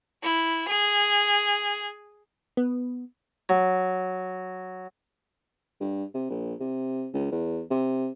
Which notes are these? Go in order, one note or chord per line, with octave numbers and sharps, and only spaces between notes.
E4
G#4
B3
F#3
G2
C3
A#1
C3
C#2
E2
C3